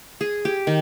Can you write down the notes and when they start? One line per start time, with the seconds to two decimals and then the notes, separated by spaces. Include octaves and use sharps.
0.21 G#4
0.45 G4
0.67 D#3